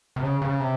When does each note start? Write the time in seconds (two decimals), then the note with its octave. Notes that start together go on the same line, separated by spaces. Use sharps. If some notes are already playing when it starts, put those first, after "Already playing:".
0.16 C3
0.22 C#3
0.42 C#3
0.60 C3